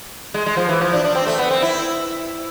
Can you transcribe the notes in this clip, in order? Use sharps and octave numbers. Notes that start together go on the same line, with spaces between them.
G#3
G#3
F3
E3
F3
D4
D4
C4
A3
B3
C4
E4